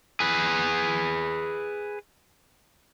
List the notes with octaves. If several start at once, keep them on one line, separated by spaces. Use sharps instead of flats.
G#4 B4